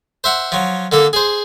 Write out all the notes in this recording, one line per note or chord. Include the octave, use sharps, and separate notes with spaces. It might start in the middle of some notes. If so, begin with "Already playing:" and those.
C5 E5 F#5
F3 F#3
D3 A#3 A4
G#4 C5